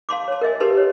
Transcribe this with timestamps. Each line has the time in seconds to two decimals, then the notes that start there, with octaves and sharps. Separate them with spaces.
0.09 F5 A5 C6 D6
0.28 C#5 A5
0.41 A#4 D#5 E5 G#5
0.60 G4 A#4 B4 A5 C6
0.77 C#5